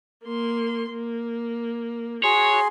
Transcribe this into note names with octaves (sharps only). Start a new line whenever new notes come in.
A#3 C6
A#3
F#4 G#4 C#5 C6